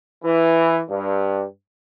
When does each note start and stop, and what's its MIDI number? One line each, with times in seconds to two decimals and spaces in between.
0.25 0.82 52
0.89 1.45 43